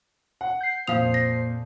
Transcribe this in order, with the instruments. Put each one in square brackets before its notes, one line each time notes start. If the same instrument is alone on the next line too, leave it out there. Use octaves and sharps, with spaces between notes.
[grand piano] F#5
[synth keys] G6 C7
[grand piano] F2 A#2 D#6 [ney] C5 [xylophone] F5 F7
[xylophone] A#6